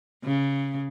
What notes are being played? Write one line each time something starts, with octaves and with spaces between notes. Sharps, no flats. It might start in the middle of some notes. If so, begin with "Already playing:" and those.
C#3